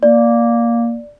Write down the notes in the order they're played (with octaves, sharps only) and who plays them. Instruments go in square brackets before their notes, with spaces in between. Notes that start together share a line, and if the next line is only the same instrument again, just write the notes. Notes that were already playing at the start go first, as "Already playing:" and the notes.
[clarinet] A#3 [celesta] D5